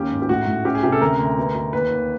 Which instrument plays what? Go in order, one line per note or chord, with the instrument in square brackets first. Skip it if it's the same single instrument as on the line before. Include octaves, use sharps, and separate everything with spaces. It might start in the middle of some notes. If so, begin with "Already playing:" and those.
Already playing: [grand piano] D#2 C#4 G4
G#2
G4
A2 F#4
A2
C#4 G4
G#4
C3 G4
A4
D2 A#4
D2
B2
B2
D#2 B4
D#2